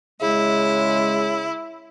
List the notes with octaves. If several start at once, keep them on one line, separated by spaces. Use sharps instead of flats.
C#3 G#3 E4